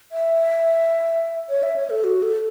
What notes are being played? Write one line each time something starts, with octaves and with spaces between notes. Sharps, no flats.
E5
C#5
E5
C#5
A4
F#4
A4